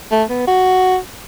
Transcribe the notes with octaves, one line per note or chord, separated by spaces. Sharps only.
A3
B3
F#4